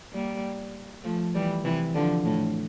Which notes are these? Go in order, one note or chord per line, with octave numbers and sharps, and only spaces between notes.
G3 A#3
F3 A3
E3 G3
C3 E3
D3 F3
A2